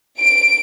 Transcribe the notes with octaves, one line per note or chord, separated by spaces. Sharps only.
D7